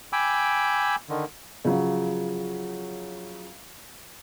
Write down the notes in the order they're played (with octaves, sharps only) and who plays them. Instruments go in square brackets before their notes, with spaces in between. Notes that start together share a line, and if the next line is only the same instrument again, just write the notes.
[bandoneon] G5 G#5 B5 D6 E6
D3 D#3
[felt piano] C#3 F3 F#3